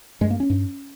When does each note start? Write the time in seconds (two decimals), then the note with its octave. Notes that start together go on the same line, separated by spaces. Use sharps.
0.21 G2 G#3
0.30 A#3
0.40 C#4
0.50 G2